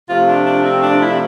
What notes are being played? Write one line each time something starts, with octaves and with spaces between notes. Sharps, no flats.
C3 F3 A3 F4
D4
D4
C4
D4
E4